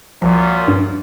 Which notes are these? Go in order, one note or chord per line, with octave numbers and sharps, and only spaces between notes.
C2 F#2 A#2 F3
G2